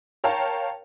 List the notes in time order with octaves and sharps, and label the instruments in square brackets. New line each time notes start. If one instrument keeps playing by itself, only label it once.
[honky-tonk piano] A#4 C#5 F5 G5 A5